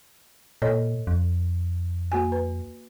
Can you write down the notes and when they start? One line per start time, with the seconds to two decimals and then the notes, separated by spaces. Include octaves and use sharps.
0.62 A#2 A4 C#5 D#5
1.07 F2
2.12 A#3 F#4 G#5
2.32 B4